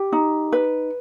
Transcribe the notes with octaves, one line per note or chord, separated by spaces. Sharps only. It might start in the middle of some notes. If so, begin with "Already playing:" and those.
Already playing: G4
D#4
B4